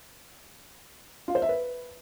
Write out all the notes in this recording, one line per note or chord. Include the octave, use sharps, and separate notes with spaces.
F4
C5
E5
B4